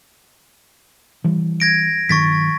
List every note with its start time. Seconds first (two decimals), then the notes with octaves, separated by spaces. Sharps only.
1.24 E3 G3
1.60 G#6 A#6 D7
2.09 G2 D#3 F#3 C#6 A6 B6